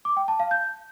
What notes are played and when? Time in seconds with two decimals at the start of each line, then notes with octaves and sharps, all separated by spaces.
0.05 D6
0.17 G5
0.28 A5
0.40 F5
0.51 G6